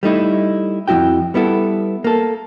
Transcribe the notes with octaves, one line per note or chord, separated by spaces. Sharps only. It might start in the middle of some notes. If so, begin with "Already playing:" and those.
G3 A3 D#4 E4
F2 F3 E4 F#4 G5
G3 B3 E4 F#4 A4
A#3 A4